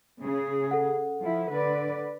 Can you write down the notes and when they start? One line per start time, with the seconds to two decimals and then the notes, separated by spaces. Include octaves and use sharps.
0.22 C#3 G#4
0.71 A4 F#5
1.21 F3 E4
1.51 D3 B4 D5